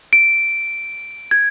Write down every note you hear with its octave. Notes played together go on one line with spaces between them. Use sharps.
D7
G#6